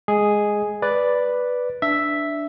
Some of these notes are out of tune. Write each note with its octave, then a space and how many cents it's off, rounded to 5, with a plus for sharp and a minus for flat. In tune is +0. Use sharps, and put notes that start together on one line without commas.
G#3 +0 G#4 +0
B4 +0 D5 +0
D4 +0 E5 +0